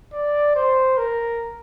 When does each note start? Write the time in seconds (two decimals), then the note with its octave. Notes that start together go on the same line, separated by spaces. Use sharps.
0.13 D5
0.55 C5
0.98 A#4